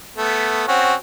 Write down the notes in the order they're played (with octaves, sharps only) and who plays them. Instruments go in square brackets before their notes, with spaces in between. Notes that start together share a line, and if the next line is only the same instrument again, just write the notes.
[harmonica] A3 B3
C4 C#4 F#4